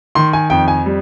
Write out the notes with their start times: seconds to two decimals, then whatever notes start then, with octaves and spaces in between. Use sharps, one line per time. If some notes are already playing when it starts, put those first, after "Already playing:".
0.15 D#3 C6
0.33 G#5
0.50 F2 G5
0.68 G#5
0.86 G3